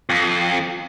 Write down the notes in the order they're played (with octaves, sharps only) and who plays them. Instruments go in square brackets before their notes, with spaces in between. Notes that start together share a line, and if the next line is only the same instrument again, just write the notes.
[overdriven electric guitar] F2